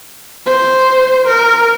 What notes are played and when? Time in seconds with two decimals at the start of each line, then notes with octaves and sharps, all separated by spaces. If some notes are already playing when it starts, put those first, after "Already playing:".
0.46 C5
1.27 A#4